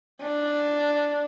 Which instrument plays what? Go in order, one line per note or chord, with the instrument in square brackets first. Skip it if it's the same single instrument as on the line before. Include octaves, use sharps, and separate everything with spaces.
[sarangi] D4